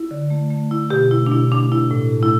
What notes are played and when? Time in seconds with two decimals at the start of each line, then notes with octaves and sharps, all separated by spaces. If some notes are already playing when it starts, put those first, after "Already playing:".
Already playing: E4
0.11 D3
0.30 A3
0.51 A3
0.71 A3 E4
0.90 B2 G4
1.11 A3 E4
1.26 D4
1.32 B2 E4
1.52 A3 D4
1.72 B2 E4
1.91 A2
2.12 A3
2.23 E4